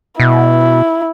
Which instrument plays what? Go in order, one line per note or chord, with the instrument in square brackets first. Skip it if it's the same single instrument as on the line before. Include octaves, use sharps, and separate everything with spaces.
[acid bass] B2 [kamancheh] E4